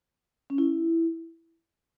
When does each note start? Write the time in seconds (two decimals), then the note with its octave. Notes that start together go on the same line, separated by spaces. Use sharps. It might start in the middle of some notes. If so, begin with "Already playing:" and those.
0.50 C#4
0.58 E4